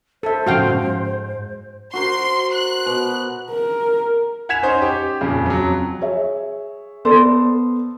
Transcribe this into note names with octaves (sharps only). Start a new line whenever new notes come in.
A4 C5 E5
A2 C#3 F3 F#4 F5 G5
G#2
F#4 A#4 C5 C6
F#6
B2
A#4
F#5 G#5 G#6 B6 E7 F7
C#4 D#4 C5
G4
F2 A#2 C#3
F2 F#3
G#4 C#5 E5
B3 A4 C5 D5